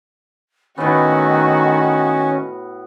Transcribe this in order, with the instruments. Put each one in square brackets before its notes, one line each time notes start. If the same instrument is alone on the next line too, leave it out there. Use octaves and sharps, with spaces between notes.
[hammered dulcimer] A2 B3 [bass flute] D#3 [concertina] C#4 [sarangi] F#4